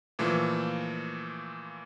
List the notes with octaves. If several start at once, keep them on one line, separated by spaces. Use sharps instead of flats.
A#2 E3 F3 A3 A#3